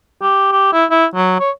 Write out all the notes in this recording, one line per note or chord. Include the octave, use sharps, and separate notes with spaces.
G4
G4
E4
E4
F#3
C#5